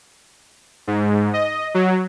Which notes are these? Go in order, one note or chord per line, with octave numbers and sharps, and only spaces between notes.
G#2
D#5
F#3